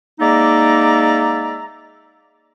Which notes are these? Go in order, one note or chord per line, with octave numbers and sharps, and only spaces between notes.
G#3 A#3 D#4 D5 E5 A#5